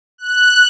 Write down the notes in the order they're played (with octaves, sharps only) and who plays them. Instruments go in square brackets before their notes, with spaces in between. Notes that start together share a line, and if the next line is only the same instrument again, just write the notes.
[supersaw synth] F#6